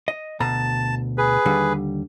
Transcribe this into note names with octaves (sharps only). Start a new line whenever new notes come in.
D#5
D2 B2 A5 A#5
G#4 B4
D#2 D3 G3